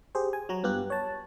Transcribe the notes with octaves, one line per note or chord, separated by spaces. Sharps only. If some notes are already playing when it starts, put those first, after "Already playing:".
G4 G#4 C5
G#5
F#3 F#4 A#5
G2 B3 F4 G4 F#6
C#5 A5